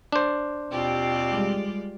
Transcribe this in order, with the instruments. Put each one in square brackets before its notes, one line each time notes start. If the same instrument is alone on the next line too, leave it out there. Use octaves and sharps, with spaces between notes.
[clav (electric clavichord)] D4 C5
[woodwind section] D#2 B2 C4 [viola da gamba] F4 G4 D5
[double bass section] G3 G#3